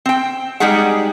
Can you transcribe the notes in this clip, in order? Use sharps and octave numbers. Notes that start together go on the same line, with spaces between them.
C4 G5
G3 G#3 D#4 G4 G#4 F#5